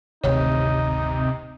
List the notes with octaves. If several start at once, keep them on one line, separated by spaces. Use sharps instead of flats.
D1 G#1 D2 C3 D#4 C#5